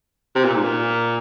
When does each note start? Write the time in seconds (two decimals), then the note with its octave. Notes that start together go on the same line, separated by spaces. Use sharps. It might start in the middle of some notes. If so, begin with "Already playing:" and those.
0.35 C3
0.45 A#2
0.55 G#2
0.64 A#2